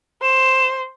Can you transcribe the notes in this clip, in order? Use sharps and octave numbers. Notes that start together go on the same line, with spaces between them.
C5 E7